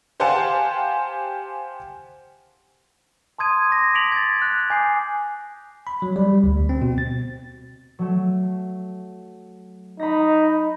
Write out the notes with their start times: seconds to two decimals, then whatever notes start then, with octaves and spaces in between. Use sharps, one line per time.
0.20 G4 C5 F5 F#5 G#5 A5
3.38 A5 C6 D#6 G#6 D#7
3.70 D6 A#6
3.94 D#6 B6 D7 F7 F#7
4.12 G#6 A6
4.42 F#6
4.70 G#5 D6 D#6 G6 C7
5.87 B5
6.02 F#3
6.16 G3
6.44 D2
6.69 C4
6.81 B2
6.98 A6
7.99 F#3 A3
10.00 D#4 B5 A#6